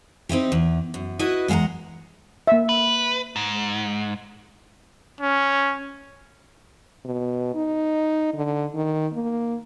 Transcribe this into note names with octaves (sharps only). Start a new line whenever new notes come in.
C4 D#4 E4 G4
E2
F#2
E4 F#4 B4 D#5
E2 G#3 F5 F#5 A#5
A#3 E5
B4
G#2
C#4
B2
D#4
D3
D#3
A#3